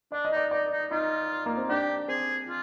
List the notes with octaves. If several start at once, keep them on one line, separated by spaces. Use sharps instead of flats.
D4 D5
D#5
D#4 D5
D#4 D5
D#4
D#4 F4
A#3
C4
D4 G4
C4 G#4
F4